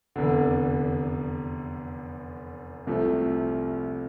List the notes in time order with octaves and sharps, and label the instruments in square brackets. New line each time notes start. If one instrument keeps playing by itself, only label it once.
[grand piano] F1 E2 D3
C2 C3 F3 A3